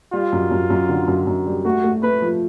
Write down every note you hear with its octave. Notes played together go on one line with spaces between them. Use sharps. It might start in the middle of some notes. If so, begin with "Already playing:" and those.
G3 F4
F#2
F#2
F#2
D3
F#2
F#2
G3
A3 F#4
A3
A3 B4
F3